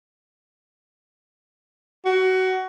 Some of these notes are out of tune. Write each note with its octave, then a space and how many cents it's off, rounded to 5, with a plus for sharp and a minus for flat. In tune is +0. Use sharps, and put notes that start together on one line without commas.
F#4 +20